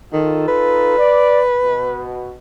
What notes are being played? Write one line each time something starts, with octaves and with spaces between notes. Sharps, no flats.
D#3 D#4 F4 A4
B4
D5
B2